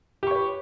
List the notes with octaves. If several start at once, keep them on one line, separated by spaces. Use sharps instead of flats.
G4 B4 C#5 C#6